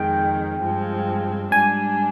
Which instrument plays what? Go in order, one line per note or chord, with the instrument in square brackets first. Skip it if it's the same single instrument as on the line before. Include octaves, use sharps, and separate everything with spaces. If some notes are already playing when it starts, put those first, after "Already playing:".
Already playing: [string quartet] F2 D#3 G#3 [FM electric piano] G5
[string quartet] G2 F3 G#3 C4
[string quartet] G#2 G3 D4 [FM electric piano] G#5